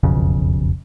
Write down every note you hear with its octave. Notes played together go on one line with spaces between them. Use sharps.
E1 B1 F2 C#3